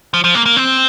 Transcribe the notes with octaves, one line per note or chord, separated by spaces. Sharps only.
F3
F3
A#3
A#3
C4